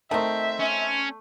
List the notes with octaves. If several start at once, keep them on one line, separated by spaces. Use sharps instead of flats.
D#3 A3 C4 E5
C#4